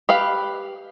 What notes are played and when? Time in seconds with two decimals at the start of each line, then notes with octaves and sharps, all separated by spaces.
0.09 G4 B4 F5